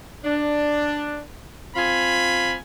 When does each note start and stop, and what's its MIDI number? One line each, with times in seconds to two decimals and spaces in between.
0.24 1.20 62
1.76 2.56 60
1.76 2.56 65
1.76 2.56 80
1.76 2.56 83